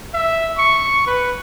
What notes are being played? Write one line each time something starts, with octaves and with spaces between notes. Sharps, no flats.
E5
C#6
B4